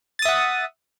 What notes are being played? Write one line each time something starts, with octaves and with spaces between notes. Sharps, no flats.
E5 F#5 D#6 A6